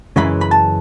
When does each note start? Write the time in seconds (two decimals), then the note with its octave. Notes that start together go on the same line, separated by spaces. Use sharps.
0.16 F#2 C#3 E3 G#3 B5
0.41 B5
0.51 A5